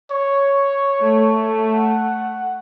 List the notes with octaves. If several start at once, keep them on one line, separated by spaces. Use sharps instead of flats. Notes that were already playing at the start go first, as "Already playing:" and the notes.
C#5
A3
F#5